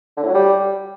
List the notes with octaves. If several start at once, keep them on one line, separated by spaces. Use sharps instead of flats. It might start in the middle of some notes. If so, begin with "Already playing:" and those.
D3
A2
F#3
G3